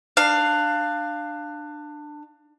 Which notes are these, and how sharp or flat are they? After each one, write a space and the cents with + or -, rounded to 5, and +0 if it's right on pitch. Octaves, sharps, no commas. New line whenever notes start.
D4 +20 F5 +0